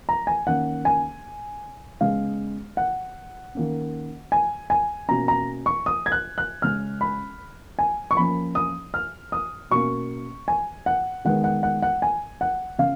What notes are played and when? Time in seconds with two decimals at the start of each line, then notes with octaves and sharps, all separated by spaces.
0.09 A#5
0.27 G#5
0.47 D#3 A#3 C#4 F#5
0.85 G#5
2.01 C#3 G#3 B3 F5
2.77 F#5
3.55 D#3 A#3 C#4
4.32 G#5
4.70 G#5
5.09 B2 A#3 C#4 A#5
5.28 A#5
5.66 C#6
5.86 D#6
6.06 G#6
6.12 F#6
6.38 F#6
6.62 C#3 G#3 C#4 F6
7.01 B5
7.79 G#5
8.11 C#6
8.17 F3 A#3 C#4 B5
8.55 D#6
8.94 F6
9.32 D#6
9.71 B2 A#3 C#4 C#6
10.48 G#5
10.86 F#5
11.25 D#3 G#3 B3 F#5
11.44 F#5
11.63 F#5
11.82 F#5
12.02 G#5
12.41 F#5
12.79 C#3 F5